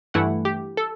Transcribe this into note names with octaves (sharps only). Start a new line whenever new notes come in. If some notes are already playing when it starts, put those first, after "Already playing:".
G2 E3 A3 E4 F#5
G4
A4